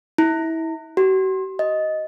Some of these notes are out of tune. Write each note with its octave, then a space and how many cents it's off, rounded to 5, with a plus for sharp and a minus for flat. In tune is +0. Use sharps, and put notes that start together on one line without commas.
E4 -25
F#4 +45
D#5 +5